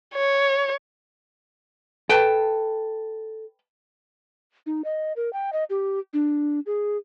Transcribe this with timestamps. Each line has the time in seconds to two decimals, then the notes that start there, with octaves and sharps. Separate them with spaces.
0.15 C#5
2.09 A4 B4 G5 A5
4.66 D#4
4.84 D#5
5.16 A#4
5.33 G5
5.53 D#5
5.70 G4
6.13 D4
6.66 G#4